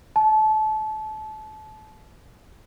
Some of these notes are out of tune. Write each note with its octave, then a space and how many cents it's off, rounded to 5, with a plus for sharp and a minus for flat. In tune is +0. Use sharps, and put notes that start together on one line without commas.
A5 -30